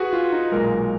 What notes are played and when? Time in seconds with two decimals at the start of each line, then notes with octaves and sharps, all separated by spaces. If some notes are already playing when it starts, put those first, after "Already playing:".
Already playing: F#4 G#4 B4
0.13 F4
0.32 D#4
0.52 B1 A#2 G#3 A#4